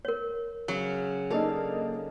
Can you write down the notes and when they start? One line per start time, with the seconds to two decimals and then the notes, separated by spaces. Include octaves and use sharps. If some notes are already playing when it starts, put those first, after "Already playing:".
0.05 A#4 C#5
0.68 C#3 F#3
1.30 A#3 D4 D#4 A4 F5